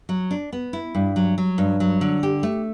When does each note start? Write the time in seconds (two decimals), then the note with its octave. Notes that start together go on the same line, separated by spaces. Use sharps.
0.09 F#3
0.31 D4
0.53 B3
0.73 E4
0.95 G2
1.16 F#3
1.38 F#3
1.58 G2
1.80 F#3
2.01 D3
2.23 G4
2.43 A3